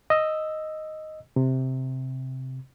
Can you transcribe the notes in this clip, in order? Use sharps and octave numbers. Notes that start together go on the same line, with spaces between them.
D#5 E6
C3